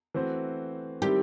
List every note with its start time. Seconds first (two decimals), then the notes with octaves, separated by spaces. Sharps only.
0.14 E3 A3 C4 F#4 C5
1.01 D#3 G3 C4 E4 G4